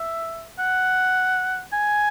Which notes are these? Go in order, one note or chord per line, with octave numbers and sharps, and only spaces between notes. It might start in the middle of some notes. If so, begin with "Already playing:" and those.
Already playing: E5
F#5
G#5